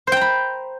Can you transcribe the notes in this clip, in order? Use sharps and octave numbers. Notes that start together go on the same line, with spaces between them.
C5 G5 A#5 B5